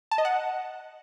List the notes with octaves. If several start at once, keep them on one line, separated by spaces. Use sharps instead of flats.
A5
D#5
F#5